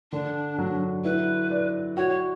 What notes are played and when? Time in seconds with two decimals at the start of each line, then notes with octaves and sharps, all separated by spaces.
0.12 D3 D4
0.58 F#3
1.04 E4 B4
1.51 D5
1.97 F#4 C#5